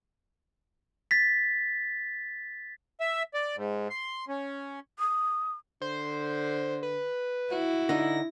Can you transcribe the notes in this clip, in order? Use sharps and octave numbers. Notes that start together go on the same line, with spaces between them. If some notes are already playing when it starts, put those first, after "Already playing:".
A6 B6
E5
D5
G#2
C6
C#4
D#6
D3 C5
B4
E4 F#4
D3 D#4 A#6